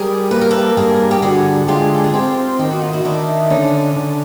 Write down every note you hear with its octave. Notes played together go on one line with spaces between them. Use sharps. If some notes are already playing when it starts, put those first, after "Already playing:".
Already playing: G3 G#4 A#4
A#3 B4
A#4
A4 B4
G2 G#4 A#4
G4
D3 F#4 G#4
G#3 F4 G4
A4
G#4
C4 F4 G4
D#3 G4
F#4
F4
E4 F#4
D#3 D4 E4
D3 C#4 D#4
D3